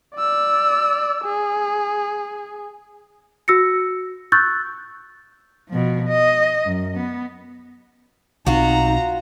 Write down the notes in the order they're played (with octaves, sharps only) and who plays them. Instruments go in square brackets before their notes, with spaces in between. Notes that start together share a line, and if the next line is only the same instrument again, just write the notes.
[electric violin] D5 E6
G#4
[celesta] F#4 E6 A#6 C#7
C#6 E6 F#6 G6 A6
[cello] B2 F3
D#5
F#2
B3
[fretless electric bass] B1 D#3 C4 [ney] D#4 [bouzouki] F4 F#4 [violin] A#5